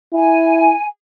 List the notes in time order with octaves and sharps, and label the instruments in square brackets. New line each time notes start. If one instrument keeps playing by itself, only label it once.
[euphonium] E4 [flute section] G#5